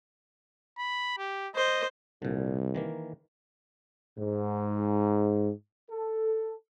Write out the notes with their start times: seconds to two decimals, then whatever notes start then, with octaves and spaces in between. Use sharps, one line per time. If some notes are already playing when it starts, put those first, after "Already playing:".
0.78 B5
1.18 G4
1.55 C5 D#5
2.22 C2 A#2 D3
2.75 D#3 E3 A#3
4.18 G#2
5.90 A4